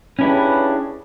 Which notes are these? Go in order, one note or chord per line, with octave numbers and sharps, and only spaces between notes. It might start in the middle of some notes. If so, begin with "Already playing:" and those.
C#3 C#4 D4 E4 G4 B4